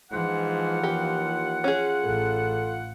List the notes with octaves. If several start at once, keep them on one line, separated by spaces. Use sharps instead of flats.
G#2 E3 F3 F4 F#5
D#2 G4
C#4 G#4
A1 A4